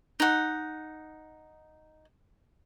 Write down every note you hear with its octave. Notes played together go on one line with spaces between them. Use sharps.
D#4 F#5